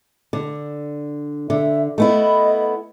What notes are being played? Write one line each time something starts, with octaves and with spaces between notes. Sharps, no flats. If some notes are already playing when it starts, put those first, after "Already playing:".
D3
D3 E5
A3 B3 E4 D#5